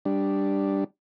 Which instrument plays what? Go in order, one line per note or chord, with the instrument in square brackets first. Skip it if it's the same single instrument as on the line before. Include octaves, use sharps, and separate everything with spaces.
[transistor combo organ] G3 D4